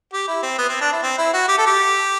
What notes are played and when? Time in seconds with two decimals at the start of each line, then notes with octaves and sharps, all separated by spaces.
0.13 G4
0.28 E4
0.42 C4
0.58 B3
0.69 C4
0.81 D4
0.93 E4
1.03 C4
1.18 E4
1.33 F#4
1.48 G4
1.58 A4
1.66 G4